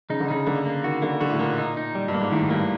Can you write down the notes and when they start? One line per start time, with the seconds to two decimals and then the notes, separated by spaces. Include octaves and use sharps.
0.09 C#3 D#4
0.20 D3
0.28 C#3 D#4
0.47 D3 A#3
0.66 A#3
0.84 D#3 F#4
1.02 D3 A#3
1.20 D3 F#4
1.30 A2
1.39 A#2 A#3
1.58 D#4
1.77 D#4
1.95 G3
2.08 G2
2.14 A#3
2.20 G#2
2.32 A2 D#3
2.50 G2 A#3